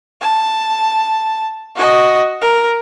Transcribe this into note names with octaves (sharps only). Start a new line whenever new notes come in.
A5
F#4 D#5
A#4